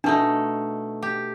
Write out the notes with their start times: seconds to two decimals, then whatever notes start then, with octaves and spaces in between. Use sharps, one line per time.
0.04 B2 A3 D4 D#4
1.02 G4